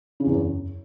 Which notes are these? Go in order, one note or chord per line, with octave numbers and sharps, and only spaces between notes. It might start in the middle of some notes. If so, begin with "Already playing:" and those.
C#3
E2
F#2